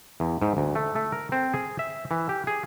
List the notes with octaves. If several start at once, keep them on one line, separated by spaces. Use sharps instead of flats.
E2
G#2
D2
A3
A3
A#4
C4
G#4
E5
E3
G4
G#4